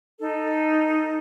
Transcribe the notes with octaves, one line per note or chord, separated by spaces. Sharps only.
D#4 A4